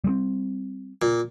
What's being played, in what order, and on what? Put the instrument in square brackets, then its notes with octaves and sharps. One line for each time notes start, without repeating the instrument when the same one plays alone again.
[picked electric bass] G3 G#3 C4
[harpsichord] A#2